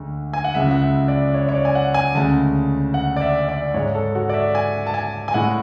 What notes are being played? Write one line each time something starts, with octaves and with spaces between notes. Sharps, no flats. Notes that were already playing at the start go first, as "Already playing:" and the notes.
Already playing: D2 D3 G#3
G#5
F#5
C#2 C#3 G#3 E5
F#5
E5
D5
C#5
C#5
D5
G#5
F#5
G#5
D2 C#3 G#3 A5
F#5
D5
E5
D5
G#2 G#3 C#5
A4
F#4
D5
E5
G#5
A5
G#5
G#5
A2 G#3 F#5